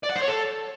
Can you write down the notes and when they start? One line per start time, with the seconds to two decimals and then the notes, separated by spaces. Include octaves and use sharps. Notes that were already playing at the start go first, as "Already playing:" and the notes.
0.04 D5
0.10 F#5
0.16 C5
0.22 C#5
0.28 A4